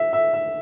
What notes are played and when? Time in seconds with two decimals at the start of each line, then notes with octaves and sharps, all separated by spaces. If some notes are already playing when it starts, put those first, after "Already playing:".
Already playing: E5
0.13 E5
0.34 E5